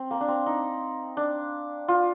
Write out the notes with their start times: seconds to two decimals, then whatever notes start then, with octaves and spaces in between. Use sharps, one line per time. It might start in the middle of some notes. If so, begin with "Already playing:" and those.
Already playing: C4
0.11 A#3
0.21 D4
0.28 C4
0.46 D#4
1.17 D4
1.88 F4